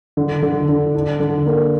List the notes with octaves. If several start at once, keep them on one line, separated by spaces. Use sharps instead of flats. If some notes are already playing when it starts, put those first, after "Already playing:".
D3
D3
D3
D4
D3
A#3